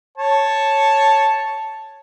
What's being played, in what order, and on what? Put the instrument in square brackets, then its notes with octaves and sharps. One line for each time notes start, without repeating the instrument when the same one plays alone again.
[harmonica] C#5 A5